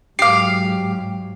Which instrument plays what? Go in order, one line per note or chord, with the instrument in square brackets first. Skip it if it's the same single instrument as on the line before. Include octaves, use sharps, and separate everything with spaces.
[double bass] G#2 F#3 [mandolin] G4 F5 [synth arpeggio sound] D6 C7